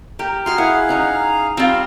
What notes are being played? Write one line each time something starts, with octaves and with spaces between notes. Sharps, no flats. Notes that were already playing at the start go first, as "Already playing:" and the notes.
G4 A#4
F#4 G#4 C6 F6
E4 G#4 F5 F#5
C#4 D#4 C#5
G3 C4 F4